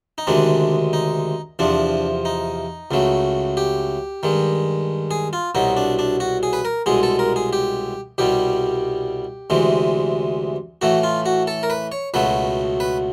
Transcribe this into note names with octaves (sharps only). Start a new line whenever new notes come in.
D#4
D2 C3 D#3 G#3 D4
D#4
E2 C3 F3 D4
D#4
C#2 C#3 F#3 A3
G4
G2 D#3 G#3
G#4
F4
C2 B2 F#3 D#4
D4
D4
F#4
G#4
B4
A#4
C2 B2 G#3 G#4
A4
A#4
G#4
G4
C2 B2 G3 G4
D2 C3 E3 G#3
A2 E3 A3 F#4
F4
F#4
A4
A#4
B4
C#5
C#2 B2 F#3 A3 B4
B4